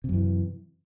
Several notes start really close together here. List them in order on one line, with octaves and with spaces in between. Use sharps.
C3 F#2 E3